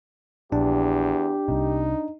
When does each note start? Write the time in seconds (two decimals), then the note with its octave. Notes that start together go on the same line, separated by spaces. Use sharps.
0.52 A#1 E2 D4 G4
1.48 C2 C3 D#4